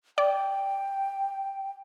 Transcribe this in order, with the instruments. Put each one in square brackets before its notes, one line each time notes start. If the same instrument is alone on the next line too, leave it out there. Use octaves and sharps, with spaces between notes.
[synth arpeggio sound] D5 [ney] G5